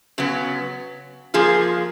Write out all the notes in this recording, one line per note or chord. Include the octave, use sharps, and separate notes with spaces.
C#3 F#3 B3
F3 A#3 F4 G#4